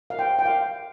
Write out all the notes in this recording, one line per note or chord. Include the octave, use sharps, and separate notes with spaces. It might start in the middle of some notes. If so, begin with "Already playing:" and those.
F5
G5
G5
F5